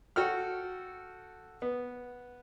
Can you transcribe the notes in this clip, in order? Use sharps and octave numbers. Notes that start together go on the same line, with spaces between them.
F#4 A4 G5 F6
B3